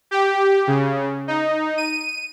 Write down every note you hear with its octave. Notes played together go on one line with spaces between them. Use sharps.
G4
C#3
D#4
D#7